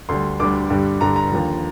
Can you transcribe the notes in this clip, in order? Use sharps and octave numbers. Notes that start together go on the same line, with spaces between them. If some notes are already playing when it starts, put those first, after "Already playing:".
D2 D3 G3 C6
D2 D3 G3 D6
G2 D3 G3
G2 D3 G3 A#5
A#5
D#2 D3 F3